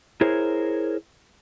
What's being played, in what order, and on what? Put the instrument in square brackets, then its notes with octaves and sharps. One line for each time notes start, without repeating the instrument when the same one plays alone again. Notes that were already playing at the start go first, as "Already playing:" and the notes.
[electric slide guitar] E4 G#4 A#4 C5 C#5